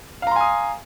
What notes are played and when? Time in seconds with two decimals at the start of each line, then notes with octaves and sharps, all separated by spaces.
0.22 F5
0.27 A#5
0.31 C6
0.36 G#5
0.41 D#6